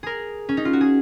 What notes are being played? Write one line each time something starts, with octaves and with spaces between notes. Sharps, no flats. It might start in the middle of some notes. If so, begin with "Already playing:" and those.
G#4 A#4
C#4
D#4
F4
F#4
G#4